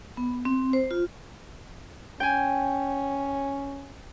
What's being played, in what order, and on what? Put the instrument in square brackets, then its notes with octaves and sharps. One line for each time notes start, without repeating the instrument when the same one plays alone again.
[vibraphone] B3
C4
C5
F4
[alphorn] C#4 [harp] G5 G#5